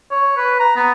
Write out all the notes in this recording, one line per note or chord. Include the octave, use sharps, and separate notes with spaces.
C#5
B4
A#5
B3